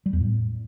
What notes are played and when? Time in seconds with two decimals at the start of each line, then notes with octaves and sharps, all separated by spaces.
0.06 G3
0.13 E2
0.20 A2